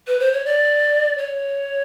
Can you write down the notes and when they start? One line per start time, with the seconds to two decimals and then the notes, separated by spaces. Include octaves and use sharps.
0.07 B4
0.20 C5
0.33 C#5
0.46 D5
1.18 C#5